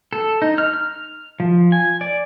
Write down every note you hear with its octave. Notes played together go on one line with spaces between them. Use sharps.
A4
D#4
F6
F6
F3
G#5
D5